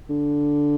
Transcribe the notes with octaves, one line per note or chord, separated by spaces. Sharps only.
D3